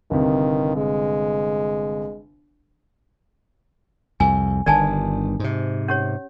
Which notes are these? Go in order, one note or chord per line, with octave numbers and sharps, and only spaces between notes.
G1 C3 D#3
G#3
C2 F2 G#5
G1 G2 D#3 D5 G#5 A5
G#2 C3
C#4 G4 C#5